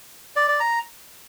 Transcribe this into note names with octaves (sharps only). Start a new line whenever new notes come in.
D5
D5
A#5